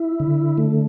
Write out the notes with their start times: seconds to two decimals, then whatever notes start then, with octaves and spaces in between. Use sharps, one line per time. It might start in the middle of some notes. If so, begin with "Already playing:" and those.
Already playing: E4
0.20 D3
0.58 A3